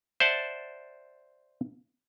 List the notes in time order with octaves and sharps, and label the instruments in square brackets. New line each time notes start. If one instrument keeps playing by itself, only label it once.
[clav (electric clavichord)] C5 D5 E5 F#5 A5